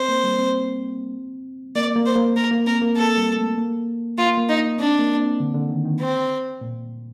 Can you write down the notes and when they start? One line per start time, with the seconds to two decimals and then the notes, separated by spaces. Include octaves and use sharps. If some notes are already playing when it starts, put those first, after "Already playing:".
Already playing: C4 C5
0.09 A#3
0.24 G3
0.39 C4
1.75 A#3 D5
1.96 A#3
2.06 C5
2.16 A#3
2.36 A#3 A#4
2.51 A#3
2.66 C4 A#4
2.82 A#3
2.97 A#3 A4
3.18 G3
3.37 A3
3.58 A#3
4.18 A#3 F4
4.38 A#3
4.49 D#4
4.78 C4 D4
4.99 A#3
5.19 C4
5.40 D3
5.54 D3
5.70 D#3
5.85 D#3
6.00 C4
6.61 A#2